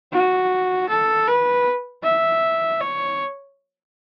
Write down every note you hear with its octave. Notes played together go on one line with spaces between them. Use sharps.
F#4
A4
B4
E5
C#5